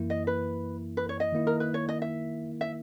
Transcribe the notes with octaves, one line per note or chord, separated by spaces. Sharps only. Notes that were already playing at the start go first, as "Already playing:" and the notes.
Already playing: F#2 E3 A#3 E4
D#5
B4
B4
C#5
D#5
D#3 A#3 E4
A#4
B4
C#5
D#5
E5
E5